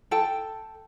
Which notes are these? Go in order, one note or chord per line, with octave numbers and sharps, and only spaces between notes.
A4 G5 A5